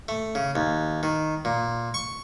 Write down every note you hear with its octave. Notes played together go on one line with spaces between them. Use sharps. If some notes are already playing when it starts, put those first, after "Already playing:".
A3
C#3
D#2
D#3
A#2
C#6